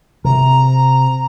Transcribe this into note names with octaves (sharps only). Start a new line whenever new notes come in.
C3 A#5